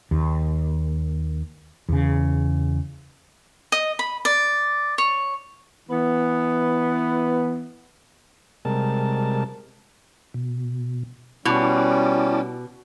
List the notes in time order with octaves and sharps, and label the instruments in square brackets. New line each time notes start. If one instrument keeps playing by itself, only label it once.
[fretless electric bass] D#2
E2 C#3
[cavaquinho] D#5
B5
D5
C#5
[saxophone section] E3 B3
[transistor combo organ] C3 G3 G#3 A#4 A5
[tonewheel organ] B2
[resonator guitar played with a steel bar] B2 [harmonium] G3 C#4 [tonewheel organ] E4 A5 D6